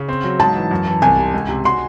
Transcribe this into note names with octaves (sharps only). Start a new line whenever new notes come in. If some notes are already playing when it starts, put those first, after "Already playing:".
Already playing: C#3
C4
F#3
G#2 A5
E3
F#2
E3
C2 G#5
C3
C#2
C3
F#4 C6